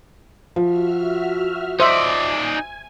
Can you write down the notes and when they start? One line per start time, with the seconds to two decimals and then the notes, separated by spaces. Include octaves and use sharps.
0.56 F3 F#4 E5 F6
1.80 D#4 C5 D5 E5 G#5